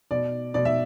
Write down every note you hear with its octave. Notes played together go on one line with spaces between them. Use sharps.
B2 D5
B2 D5
E5